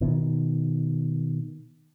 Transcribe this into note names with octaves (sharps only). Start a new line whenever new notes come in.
B2 D#3